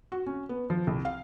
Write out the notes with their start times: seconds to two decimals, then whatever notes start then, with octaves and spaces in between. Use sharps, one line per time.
0.12 F#4
0.26 C#4
0.49 B3
0.70 F3
0.87 C2
1.05 F5